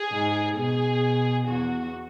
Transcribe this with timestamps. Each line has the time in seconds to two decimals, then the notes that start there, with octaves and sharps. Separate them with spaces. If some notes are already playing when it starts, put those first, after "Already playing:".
Already playing: G#4
0.12 G#2
0.57 B2 G#4
1.47 E2 F#4